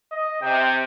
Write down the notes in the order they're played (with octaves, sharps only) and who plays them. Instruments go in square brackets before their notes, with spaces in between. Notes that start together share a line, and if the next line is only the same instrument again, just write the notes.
[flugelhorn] D#5
[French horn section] C3 [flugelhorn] G5